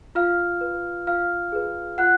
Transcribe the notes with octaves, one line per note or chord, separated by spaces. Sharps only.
F4 F5 F6
B4
F4 F5 F6
G#4 B4
F4 F#5 F#6